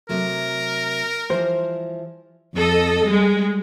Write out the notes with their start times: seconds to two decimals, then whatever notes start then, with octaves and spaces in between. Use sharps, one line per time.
0.09 C3 F#3 A3 A#4
1.30 E3 F3 G3 C5
2.56 F2 A4 D#5
3.07 G3 G#3